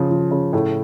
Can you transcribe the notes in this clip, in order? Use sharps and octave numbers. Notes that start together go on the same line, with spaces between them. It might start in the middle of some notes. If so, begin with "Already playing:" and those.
Already playing: C#3 F3
F3
C#3
A2